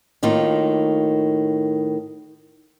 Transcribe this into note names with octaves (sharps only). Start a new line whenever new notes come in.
A2 D#3 A#3 F4